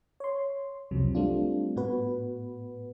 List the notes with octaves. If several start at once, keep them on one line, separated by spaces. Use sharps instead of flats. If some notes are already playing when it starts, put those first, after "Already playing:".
C#5 C6
C2 F2 C3 F3 F#3
G3 A3 C4 D4 F4
A2 B3 F#4 B4